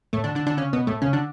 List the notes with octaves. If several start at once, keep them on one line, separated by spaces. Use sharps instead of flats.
A2 A3
D3 D4
D3 D4
D3 D4
C#3 C#4
B2 B3
A2 A3
C#3 C#4
D3 D4